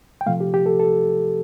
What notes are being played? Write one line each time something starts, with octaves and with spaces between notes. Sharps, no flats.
G5
C3 F3 A3 F5
G4
G4
A4
A4